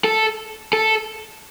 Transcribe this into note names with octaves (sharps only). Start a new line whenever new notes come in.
A4
A4